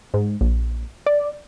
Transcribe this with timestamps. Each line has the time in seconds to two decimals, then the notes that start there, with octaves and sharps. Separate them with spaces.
0.14 G#2
0.41 A#1
1.06 D5